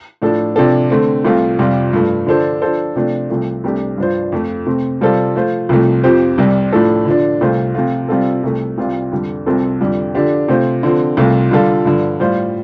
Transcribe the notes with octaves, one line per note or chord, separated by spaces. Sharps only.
A2 F3 D4 A4
C3 F3 D4 A4
D3 A3 C4
C2 C3 A3 F4
F2 C3 G3 F4
G2 F3 A3
D3 F3 D4 A4 C5
F3 D4 A4 C5
C3 F3 A3 D4
C2 C3 F3 A3
C2 C3 A3 D4 G4
G2 F3 D4 F4 C5
F2 F3 A3
C3 A3 C4
C3 G3 F4 A4 C5
F3 A3 F4 C5
C2 C3 F3 A3
F2 F3 C4 G4 C5
C2 C3 G3
A2 F3 A3 D4 A4
D3 F3 D4
C2 C3 A3 F4 C5
C3 F3 A3 F4
C3 G3 C4 F4 A4
C2 C3 A3
C2 C3 G3 F4
F2 D3 G3
C2 C3 F3 C4 A4
F2 D3 G3
D3 F3 D4 G4
C3 A3 F4 C5
D3 F3 C4
C2 C3 A3 F4
D3 G3 F4 A4
G2 D3 F3
A2 G3 F4 C5